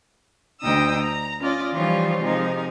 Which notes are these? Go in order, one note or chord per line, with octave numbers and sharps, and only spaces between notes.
D2 D#4 G5 D#6 E6
A#5
C#4 F4 D5 D#5
E3 F3 G3 D#4 F4 C#5
C3 F3 G#3 D#4 A#4